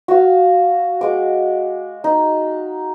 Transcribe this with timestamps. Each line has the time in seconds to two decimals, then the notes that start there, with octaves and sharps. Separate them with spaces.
0.08 F#4 F5
1.01 G#3 D6
2.04 D#4